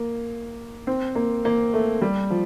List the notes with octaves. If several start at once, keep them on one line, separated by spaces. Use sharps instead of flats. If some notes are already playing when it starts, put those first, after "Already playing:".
Already playing: A#3
C4
A#3
A#3
A3
G3
F3